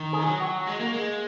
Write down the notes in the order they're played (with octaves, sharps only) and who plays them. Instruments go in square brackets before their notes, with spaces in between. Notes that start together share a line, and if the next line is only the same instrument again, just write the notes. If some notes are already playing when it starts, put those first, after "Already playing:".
Already playing: [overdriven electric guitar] D#3
[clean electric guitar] G#4
[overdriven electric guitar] E3
F#3
[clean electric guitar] F#4
[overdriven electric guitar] G#3
A#3
G#3